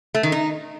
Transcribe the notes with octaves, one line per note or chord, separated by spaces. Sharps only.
A3
D#3
D#4